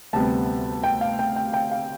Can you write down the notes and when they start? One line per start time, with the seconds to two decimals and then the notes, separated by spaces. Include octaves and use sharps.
0.13 D2 C3 G3 B3 A5
0.84 G5
1.01 F5
1.19 G5
1.36 G5
1.54 G5
1.71 F5